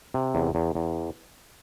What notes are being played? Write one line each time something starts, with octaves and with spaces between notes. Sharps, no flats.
C3
E2
E2
E2